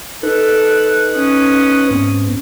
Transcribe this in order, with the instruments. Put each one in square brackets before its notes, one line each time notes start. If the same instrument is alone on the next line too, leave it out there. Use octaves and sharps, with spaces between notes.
[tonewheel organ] D#4 B4 F#6 [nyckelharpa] A4
[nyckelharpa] C#4 D#6
[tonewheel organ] G#2 B3 C4